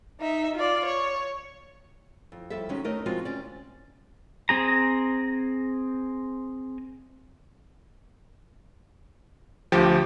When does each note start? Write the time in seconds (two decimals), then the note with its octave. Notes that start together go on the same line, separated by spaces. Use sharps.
0.21 D#4 E5
0.55 F4 D5
0.85 C#5
2.32 F2
2.50 F2 G3 A4 E5
2.69 D#3 F#3 G#3 C#4 D#4
2.84 A3 D#4 A#4 C#5 D#5
3.06 F3 G#3 C4 F4 F#4
3.25 D2 C#4 D5
4.49 C4 G#4 A#5
9.72 D2 F3 G4